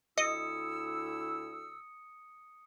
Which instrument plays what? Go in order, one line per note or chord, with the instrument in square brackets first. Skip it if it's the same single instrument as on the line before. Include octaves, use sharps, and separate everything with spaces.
[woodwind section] D2 E4 E6 [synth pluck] D#5 [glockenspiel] D#6 C#7